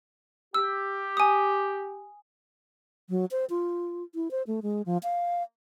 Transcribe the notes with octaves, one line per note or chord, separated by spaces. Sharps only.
G4 E6
G#5 D#6
F#3
C5
F4
E4
C5
A3
G#3
F3
F5